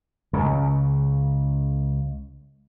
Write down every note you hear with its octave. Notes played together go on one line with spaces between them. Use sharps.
C#2 C#3